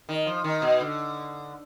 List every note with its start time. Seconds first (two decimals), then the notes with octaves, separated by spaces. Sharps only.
0.09 D#3
0.26 F3
0.44 D#3
0.62 B2
0.81 D3